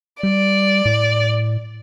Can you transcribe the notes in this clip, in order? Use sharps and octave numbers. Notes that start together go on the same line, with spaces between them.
G3 D5
A2